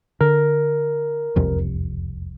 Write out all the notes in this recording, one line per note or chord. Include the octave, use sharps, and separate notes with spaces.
D3 A#4
E1 C2 F2